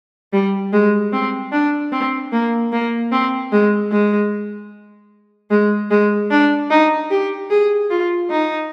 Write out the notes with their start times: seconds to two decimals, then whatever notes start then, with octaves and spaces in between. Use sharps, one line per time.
0.33 G3
0.72 G#3
1.12 C4
1.52 D4
1.92 C4
2.32 A#3
2.72 A#3
3.12 C4
3.52 G#3
3.91 G#3
5.51 G#3
5.90 G#3
6.30 D4
6.70 D#4
7.10 G4
7.50 G#4
7.90 F4
8.30 D#4